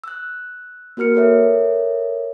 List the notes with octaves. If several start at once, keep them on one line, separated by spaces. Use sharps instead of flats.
E6 F#6
A#3 F#4 A#4 F6 C#7
A4 A#4 C#5 E5